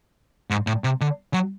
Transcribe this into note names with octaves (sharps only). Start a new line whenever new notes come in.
G#2
A2
C3
D3
F#3